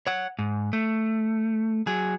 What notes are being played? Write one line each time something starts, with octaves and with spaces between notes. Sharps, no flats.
C#5 F#5
G#2
A3
F#3 G#4